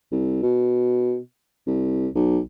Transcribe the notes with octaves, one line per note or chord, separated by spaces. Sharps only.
C2
B2
C2
B1